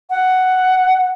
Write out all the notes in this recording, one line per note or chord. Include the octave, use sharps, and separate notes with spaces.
F#5